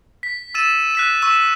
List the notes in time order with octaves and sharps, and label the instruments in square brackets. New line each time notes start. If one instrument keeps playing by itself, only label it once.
[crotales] B6
E6 A6 D#7 E7
F#6 B6 D#7
C#6 E6 E7